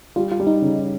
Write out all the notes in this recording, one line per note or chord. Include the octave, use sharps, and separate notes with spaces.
G3 F4
F4
G3
D#4
C#3